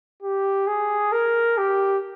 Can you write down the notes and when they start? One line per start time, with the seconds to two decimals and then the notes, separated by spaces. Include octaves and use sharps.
0.22 G4
0.67 G#4
1.12 A#4
1.57 G4